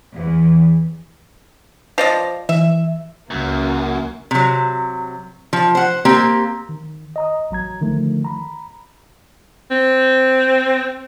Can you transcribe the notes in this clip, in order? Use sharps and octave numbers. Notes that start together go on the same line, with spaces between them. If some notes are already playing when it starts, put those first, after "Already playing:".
E2
F3 D5 D#5
E3 E5
C#2 F#2 A#3
C3 F#3
F3
C5 F#5
A#3 C4 G4
D#3
D#5 A#5 D#6
A1 F#3 A#5 G#6
D3 D#3 F3 A3
A#5 B5
C4